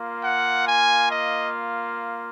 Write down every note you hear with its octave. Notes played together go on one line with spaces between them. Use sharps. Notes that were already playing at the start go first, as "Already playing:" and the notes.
Already playing: A#3 F4
F#5
G#5
D#5